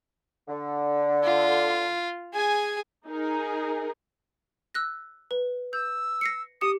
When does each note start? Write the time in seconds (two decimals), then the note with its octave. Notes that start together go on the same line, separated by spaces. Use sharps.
0.48 D3
1.24 F4
2.33 G#4 G#5
3.06 D#4 G#4 A#4
4.74 E6 F#6 A#6
5.31 B4
5.73 E6 G6
6.21 A#6 C7 C#7
6.61 G4 D#6 C#7